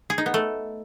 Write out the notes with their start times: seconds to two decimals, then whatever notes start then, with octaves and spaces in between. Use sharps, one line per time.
0.10 G#4
0.18 D#4
0.26 B3
0.34 A3